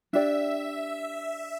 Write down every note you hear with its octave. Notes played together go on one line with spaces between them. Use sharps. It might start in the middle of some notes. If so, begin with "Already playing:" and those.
D4 G4 D5 E5